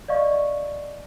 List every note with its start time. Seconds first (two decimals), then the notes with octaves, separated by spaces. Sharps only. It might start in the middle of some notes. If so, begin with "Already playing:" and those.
0.08 D5 D#5 F5 C#6